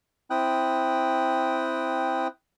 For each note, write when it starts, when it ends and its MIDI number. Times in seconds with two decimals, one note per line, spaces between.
0.30 2.28 60
0.30 2.28 64
0.30 2.28 79
0.30 2.28 87
0.30 2.28 90